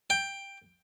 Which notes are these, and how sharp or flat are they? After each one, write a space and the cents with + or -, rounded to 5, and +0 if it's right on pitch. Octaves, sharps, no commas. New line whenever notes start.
G5 +10